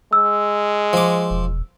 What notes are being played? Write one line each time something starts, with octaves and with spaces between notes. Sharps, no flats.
G#3 E6
F3 D6
E1